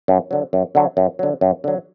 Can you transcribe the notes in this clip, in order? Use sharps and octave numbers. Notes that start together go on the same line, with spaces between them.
F#2
D3 F#3
F#2
D3 F#3
F#2
D3 F#3
F#2
D3 F#3